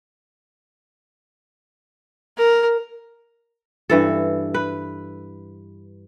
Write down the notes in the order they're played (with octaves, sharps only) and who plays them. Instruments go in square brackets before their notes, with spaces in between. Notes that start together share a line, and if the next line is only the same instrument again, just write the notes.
[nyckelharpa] A#4
[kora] G2 E3 A4
B4